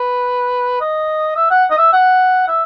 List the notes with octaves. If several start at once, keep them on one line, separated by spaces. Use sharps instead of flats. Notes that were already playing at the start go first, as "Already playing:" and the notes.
Already playing: B4
D#5
E5
F#5
D#5
E5
F#5
E5